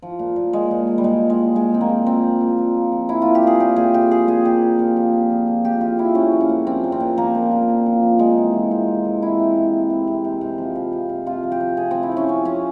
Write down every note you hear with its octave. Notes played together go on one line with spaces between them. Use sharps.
F3
A#2
A#2
A#2 G#3
A#2
A#2
G3
A#2 G#3
F3
G#3
A#2
A#2 G#3
F3 C4
A#3
A#2
A#2 C4
A#2
A#2
F3
F3
F3
F3 E4
A#2 F4
G4
A#2 G#4
A#2 G4
A#2 G#4
A#2 G4
F3 G#4
A#2 G#4
A#2 G4
F3
A#2
F3
A#2
F3
F3
A#2 G4
F3 F4
F3 E4
A#2 C#4
F3
C#4
A#2
F3 C4
A#2
C4
A#2
F3 A#3
A#2
A#2
F3
F3
F3
C3 G#3
E3
E3
C3
C3
E3
C3 E4
C3
C3
C3
C3
C3
C3
C3
F3
F3
F3
C3
C3 F4
F3
G4
F3
C3 G#4
C3 C4
E4
F3 C#4
F3 C#4
F3 C#4